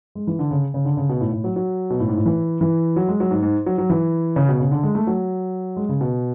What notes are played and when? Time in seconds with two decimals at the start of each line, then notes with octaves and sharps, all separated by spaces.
0.15 G#3
0.27 E3
0.39 D3
0.51 C#3
0.74 C#3
0.85 D3
0.97 C#3
1.09 B2
1.21 A2
1.32 A2
1.44 F#3
1.56 F#3
1.90 B2
2.00 A2
2.08 G#2
2.17 A2
2.26 E3
2.61 E3
2.96 F#3
3.08 G#3
3.20 F#3
3.31 G#2
3.43 G#2
3.66 F#3
3.78 F#3
3.90 E3
4.36 C#3
4.48 B2
4.60 C#3
4.71 D3
4.83 G#3
4.95 A3
5.07 F#3
5.77 G#3
5.89 C#3
6.01 B2